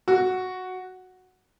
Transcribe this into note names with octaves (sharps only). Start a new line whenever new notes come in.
F#4